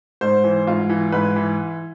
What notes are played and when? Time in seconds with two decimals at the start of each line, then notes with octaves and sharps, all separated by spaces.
0.21 G#2 C5
0.44 E3
0.67 G#2 F4
0.89 E3
1.12 G#2 B4
1.36 E3